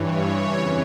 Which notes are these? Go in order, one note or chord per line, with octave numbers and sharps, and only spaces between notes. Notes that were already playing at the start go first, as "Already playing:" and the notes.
Already playing: G2 E3 C#5
F2 C#3 E3